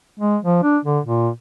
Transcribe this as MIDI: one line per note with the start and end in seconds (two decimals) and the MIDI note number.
0.20 0.37 56
0.43 0.61 53
0.63 0.78 62
0.85 0.99 50
1.05 1.29 46